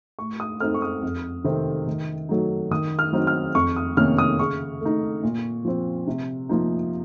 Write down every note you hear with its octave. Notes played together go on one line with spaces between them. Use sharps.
A2 C#6
D#6
A3 C4 D#4 F6
C#6
D#6
F2
C3 D#3 A3 C4
D#3
F#3 A3 D#4
D#3 D#6
F6
F#3 C4 D#4
F6
F2 C#6
D#6
C3 D#3 A#3 C#4 F6
D#6
C#3 C#6
A3 D#4
A#2
F3 C4
C3
F3 A#3 D#4